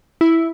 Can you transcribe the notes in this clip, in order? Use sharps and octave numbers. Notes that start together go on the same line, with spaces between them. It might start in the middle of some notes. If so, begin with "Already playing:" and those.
E4